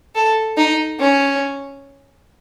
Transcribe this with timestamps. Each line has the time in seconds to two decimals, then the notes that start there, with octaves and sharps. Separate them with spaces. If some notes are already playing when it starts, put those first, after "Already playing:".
0.15 A4
0.58 D#4
1.00 C#4